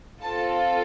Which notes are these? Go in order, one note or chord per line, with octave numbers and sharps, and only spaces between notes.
C4 F4 A4 A5